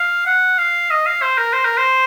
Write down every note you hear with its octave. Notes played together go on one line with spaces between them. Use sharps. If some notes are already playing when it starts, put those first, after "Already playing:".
Already playing: F5
F#5
F5
D#5
F5
C5
A#4
C5
A#4
C5